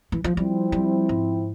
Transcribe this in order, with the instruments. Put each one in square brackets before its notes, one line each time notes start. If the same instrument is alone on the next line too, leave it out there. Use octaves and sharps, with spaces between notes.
[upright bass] E3
F3
[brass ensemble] F3 C4 E4 [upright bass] G3
[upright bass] G3
G#2